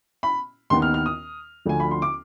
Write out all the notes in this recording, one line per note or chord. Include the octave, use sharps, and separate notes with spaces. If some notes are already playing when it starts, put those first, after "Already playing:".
B5
D#2 D#3 B3 C6
F6
F6
D#6
D2 D3 F3 G#5
B5
C6
D6